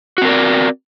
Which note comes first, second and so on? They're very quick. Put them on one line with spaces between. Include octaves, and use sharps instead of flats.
F#4 C4 A#4 D5